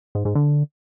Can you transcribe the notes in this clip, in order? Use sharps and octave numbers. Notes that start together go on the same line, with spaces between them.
G#2
G#2
D3